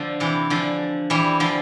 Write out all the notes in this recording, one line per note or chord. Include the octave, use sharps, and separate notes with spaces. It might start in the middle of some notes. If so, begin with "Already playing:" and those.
Already playing: D3 F3
C3 E3
D3 F3
E3 G3
D3 F3